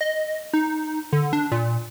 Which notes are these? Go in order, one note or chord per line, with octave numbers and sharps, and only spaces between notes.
D#5
D#4
D3
D4
A#2